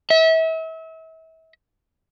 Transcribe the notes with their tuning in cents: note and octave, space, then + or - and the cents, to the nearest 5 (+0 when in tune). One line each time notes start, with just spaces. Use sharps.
E5 -35